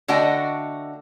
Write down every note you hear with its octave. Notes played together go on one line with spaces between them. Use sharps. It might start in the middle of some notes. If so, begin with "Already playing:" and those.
D3 A3 F#4 D#5 G5